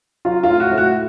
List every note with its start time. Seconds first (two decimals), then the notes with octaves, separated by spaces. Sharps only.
0.25 F#3 F4
0.43 F4
0.49 A2
0.60 F#4
0.71 A2
0.78 F#4